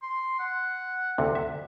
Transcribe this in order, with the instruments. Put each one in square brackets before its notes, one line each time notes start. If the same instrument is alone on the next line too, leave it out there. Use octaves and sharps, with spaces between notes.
[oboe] C6
F#5
[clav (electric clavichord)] D2 C3
E5